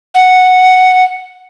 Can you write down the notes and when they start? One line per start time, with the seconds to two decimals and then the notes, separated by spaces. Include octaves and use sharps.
0.15 F#5